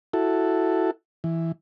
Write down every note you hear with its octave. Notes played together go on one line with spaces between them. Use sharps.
E4 F#4 A4
E3